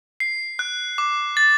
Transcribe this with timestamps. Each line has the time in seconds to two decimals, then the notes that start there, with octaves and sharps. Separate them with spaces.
0.20 C7
0.59 F#6
0.98 D6
1.37 A6